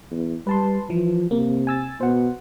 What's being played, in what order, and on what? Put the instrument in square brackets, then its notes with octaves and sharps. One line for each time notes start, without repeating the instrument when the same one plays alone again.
[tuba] E2
[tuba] G3 [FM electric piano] B4 A5 C6
[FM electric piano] E3 [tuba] F3
[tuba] C3 [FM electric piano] A#3
[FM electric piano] G#5 E6 A6
[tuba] B2 [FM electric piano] C5 F#5